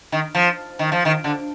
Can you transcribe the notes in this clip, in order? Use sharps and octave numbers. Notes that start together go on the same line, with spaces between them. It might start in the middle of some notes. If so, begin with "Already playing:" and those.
D#3
F3
D#3
F3
D#3
D3